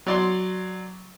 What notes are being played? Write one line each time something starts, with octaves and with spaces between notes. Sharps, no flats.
F#3 D5 C6